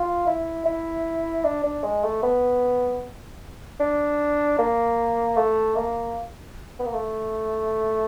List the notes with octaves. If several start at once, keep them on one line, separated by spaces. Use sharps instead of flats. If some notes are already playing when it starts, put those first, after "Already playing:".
Already playing: F4
E4
E4
D4
D4
G#3
A3
B3
D4
A#3
A3
A#3
B3
A#3
A3